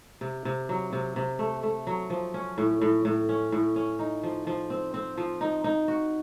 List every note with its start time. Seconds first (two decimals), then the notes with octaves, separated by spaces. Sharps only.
0.21 C3
0.45 C3
0.69 F#3
0.93 C3
1.16 C3
1.39 A3
1.63 A3
1.87 F#3
2.10 F3
2.34 C#4
2.58 A2
2.81 A2
3.05 A2
3.29 C#4
3.52 A2
3.76 C#4
3.99 D#4
4.23 F3
4.47 F3
4.70 C4
4.94 C4
5.18 F3
5.41 D#4
5.64 D#4
5.88 F#4